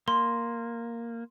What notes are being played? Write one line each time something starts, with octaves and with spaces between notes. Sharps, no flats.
A#3 C6